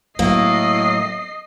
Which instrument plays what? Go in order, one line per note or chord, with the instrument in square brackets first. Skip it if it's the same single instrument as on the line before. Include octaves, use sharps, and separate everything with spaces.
[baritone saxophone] A2 [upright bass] F#3 [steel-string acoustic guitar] A#3 [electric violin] D#5 C7